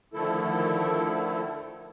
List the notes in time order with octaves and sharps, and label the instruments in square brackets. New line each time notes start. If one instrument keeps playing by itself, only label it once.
[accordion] D3 D#3 F3 A3 E4 A4